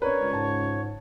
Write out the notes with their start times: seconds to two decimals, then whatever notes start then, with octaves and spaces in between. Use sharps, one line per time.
0.02 C#4 D4 A#4 B4 C#5
0.22 C#2
0.33 G#2 A5